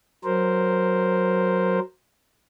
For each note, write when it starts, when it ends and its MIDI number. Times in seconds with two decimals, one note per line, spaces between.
0.24 1.80 54
0.24 1.80 70
0.24 1.80 72